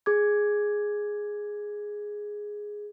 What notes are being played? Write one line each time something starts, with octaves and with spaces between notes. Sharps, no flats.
G#4 D6 G#6